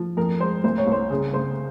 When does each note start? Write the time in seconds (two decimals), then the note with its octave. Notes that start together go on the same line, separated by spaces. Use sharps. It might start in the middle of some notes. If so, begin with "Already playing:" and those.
Already playing: F3
0.17 F2 A#4
0.40 G#3 C5
0.64 C2 C5
0.78 C#5
0.87 C2
0.92 C5
1.10 C#3 G#4
1.34 C#3 C5